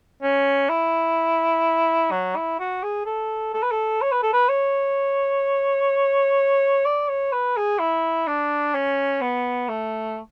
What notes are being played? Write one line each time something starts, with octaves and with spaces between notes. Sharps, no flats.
C#4
E4
F#3
E4
F#4
G#4
A4
A4
B4
A4
C#5
B4
A4
B4
C#5
D5
C#5
B4
G#4
E4
D4
C#4
B3
A3